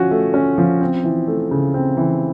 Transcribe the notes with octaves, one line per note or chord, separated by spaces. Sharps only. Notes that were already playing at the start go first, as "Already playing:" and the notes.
Already playing: F3 C#4 F#4
A3
C#4
F3
C4
E3
A3
C#3
C4
E3